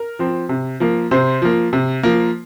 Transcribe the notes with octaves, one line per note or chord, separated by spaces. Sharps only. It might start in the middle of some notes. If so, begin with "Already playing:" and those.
Already playing: A#4
F3 C4
C3
F3 A#3
C3 C5
F3 A#3
C3
F3 A#3